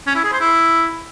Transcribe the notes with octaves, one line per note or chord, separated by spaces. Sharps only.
C#4
E4
G#4
C5
E4